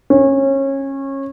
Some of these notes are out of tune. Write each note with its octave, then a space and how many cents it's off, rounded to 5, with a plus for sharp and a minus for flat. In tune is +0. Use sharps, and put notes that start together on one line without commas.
C#4 -25